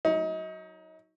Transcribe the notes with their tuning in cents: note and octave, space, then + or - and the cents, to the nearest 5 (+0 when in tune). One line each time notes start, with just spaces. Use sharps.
F#3 +0 D#4 +30